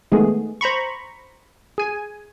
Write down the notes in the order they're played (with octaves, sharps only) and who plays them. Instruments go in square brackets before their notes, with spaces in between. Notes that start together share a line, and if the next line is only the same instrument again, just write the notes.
[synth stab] D#3 G#3 A3 B3 G#4
C5 A#5 B5 C#6
G#4 G#5